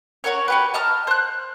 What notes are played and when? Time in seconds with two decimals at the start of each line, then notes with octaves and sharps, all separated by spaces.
0.24 C#4 F#4 A#4 C#5
0.48 F#4 G4 B4
0.74 D#5 A5 A#5 F6
1.07 C5 F#6